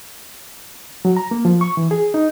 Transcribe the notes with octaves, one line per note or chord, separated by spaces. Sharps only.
F#3
A#5
A#3
F3
C#6
E3
G#4
D#4